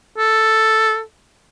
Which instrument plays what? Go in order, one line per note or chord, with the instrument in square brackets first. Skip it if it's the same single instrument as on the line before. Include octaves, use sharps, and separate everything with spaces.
[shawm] A4